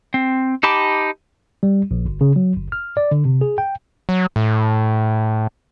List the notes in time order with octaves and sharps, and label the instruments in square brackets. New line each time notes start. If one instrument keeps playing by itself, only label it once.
[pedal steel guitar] C4
D#4 G4 A5 B5 D6
[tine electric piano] G3
A#1
G1
C#3
F#3
G1
F6
D5
D3
C3
G#4
G5
[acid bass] F#3
A2